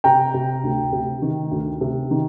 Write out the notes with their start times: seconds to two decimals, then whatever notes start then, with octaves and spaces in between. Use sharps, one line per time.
0.04 C3 G5 A#5
0.34 C3
0.63 D2
0.92 C3
1.22 D#3
1.51 D2
1.81 C3
2.11 D#3